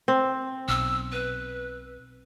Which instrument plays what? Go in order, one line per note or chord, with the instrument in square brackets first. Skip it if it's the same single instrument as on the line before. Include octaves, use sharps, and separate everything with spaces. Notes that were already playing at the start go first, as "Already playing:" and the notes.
[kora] C4
[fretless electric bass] B1 [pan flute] E6
[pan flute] B4